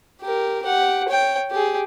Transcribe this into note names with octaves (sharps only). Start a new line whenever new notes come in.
G4 A#4
G4 F#5
C#5 G5
G4 G#4